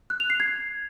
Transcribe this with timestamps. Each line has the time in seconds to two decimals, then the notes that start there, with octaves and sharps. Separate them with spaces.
0.10 F#6
0.20 F7
0.30 C7
0.40 G#6